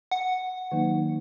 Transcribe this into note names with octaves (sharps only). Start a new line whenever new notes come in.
F#5
D#3 F#3 A#3 D#4